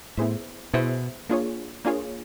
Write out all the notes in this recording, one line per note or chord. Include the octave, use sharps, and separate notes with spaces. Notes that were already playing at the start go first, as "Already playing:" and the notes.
A2 B3 E4 G#4 C5 E5
B2 B3 E4 G#4 C5 E5
A#3 D4 F4 G#4 C#5
A#3 D4 F4 G#4 C#5